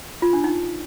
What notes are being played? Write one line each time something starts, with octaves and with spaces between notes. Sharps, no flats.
F4
D4
D#4